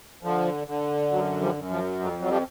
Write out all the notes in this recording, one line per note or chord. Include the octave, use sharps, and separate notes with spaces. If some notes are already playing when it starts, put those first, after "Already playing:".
D3 F3
D3
F#2 F#3
F3 G3
F#2
F3
F2 F#3
F#3
F3 G3